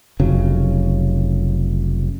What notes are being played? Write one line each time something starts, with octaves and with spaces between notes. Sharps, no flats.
F1 C#3 F#3